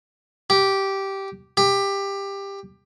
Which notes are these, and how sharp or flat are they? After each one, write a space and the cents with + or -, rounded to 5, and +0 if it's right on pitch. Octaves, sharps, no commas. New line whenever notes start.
G4 -10
G4 +15